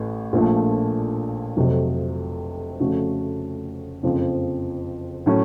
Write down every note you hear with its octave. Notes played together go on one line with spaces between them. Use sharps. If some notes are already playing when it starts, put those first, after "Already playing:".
Already playing: A1 A2
A#1 A#2 F3 A3
F1 F2 C3 F#3
F2 C#3 A3 C#4 F#4
F#1 F2 C#3 F3 C4
A2 F#3 A3 C#4